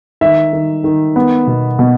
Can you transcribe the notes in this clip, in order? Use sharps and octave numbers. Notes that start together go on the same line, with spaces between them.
D#3 E5
D#3
D#3
B3
B2
B2